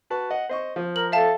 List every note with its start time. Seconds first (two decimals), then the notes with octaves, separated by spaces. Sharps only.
0.10 F#4 B4 A5
0.30 D#5 F#5
0.49 C5 D#5 C#6
0.76 F3
0.96 A#4 F#7
1.12 A4 E5 F5 A5